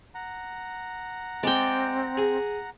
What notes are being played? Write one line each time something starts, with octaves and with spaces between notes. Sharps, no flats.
F#5 A#5
G#3 C4 D5 G5
G#4